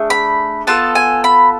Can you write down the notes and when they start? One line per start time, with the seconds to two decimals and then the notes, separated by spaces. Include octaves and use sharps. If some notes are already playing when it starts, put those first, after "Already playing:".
Already playing: A3 D4 G#4
0.10 B5
0.67 B3 F4 A4 A5
0.95 G#5
1.24 B5